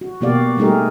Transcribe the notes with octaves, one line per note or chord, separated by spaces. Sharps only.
F#4
B2 A#3 F#4 G4 D5 F5
G3 A3 D#4 G4 G#4 A#4